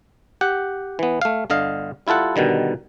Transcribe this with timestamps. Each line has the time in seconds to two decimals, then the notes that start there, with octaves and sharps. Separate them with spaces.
0.41 G4 F#5
0.99 E3 B3
1.22 A3 F5
1.50 G1 D3 D#5 F5
2.07 G3 E4 F4 A4 F#5
2.36 B2 D3 D#3 G3